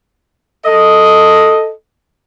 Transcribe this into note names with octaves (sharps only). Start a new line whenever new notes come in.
A4 D#5